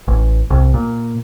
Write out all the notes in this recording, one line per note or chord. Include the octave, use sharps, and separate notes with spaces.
A1
C2
A#2